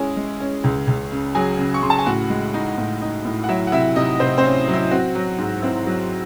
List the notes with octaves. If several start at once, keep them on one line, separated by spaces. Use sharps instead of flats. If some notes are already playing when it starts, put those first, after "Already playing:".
Already playing: G#3 C#4 E4 G#4 G#5
G#3
C#4
C#2
C#2
C#3
F#3 G#4 G#5
C#3
C#6
C#3 C6
A5
G#5
A2 F#4 F#5
G#3
D#4
A2
D#4
A2
F#5
F#3 E4 E5
F#5
C3 E4 E5
C3 D#4 D#5
C3 C4 C5
C4 C5
C#4
F#3
E4
C4 F#4
F#3
G#2
C4 E4
F#3